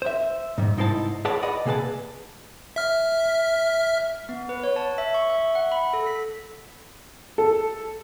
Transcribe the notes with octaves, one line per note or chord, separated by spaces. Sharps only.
C5 E5
G#2 G3
C2 G#2 D#4 E4 C5 A5
G#4 B4 C#5 D5 F#5 A5
D5 D#5 F#5 B5
C3 A#3 G#4 B4 A5
E5 F6
B3
B4
C#5
A5
E5
C#6
E5
F#5
B5
A4
B6
A4